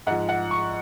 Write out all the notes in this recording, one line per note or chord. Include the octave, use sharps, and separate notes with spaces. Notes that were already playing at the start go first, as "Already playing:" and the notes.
G#2 F3 F#5
F#5
C#6